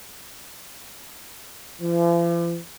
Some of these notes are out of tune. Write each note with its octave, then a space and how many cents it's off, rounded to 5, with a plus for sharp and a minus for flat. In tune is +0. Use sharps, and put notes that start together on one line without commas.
F3 -45